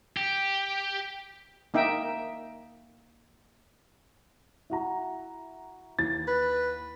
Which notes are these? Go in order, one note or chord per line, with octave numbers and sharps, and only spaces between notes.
G4
A#3 D#4 E5 G5
E4 F#4 A#5
D#2 E3 A6
B4